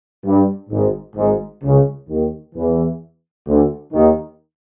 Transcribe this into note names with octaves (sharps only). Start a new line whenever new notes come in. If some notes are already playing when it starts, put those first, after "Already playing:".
G2
G#1 G#2
G#1 G#2
C#2 C#3
D#2 D#3
E2 E3
D2 D3
D#2 D#3